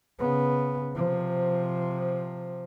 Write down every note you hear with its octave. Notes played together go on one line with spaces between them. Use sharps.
C#3 B3
C3 F3